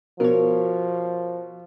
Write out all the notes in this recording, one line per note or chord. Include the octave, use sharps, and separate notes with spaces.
B2 F3 A#4 C#5